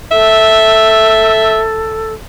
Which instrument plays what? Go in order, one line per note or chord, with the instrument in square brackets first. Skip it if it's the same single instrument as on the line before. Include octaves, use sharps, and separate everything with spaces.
[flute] A4 [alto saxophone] E5